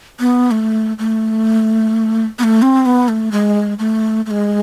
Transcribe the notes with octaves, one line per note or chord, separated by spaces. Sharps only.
B3
A3
A3
B3
A3
C4
B3
A3
G#3
A3
A3
G#3